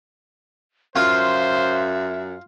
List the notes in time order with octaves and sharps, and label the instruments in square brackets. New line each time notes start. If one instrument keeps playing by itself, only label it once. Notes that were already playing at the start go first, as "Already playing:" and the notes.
[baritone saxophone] F#2 [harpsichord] F4 [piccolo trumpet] C5 [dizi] E5